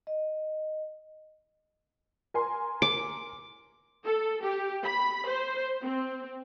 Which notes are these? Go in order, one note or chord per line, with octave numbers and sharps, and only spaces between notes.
D#5
A#4 G#5 C6
D6
A4
G4
B5
C5
C4